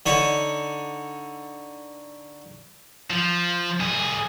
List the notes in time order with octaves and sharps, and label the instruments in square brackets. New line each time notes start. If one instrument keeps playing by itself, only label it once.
[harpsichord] D3 D#4 C#5 B5
[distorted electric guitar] F3
C2 G#4